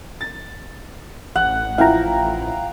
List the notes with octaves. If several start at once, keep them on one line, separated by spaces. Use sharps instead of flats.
A6
A1 F#5
F3 E4 F5 G5 A#5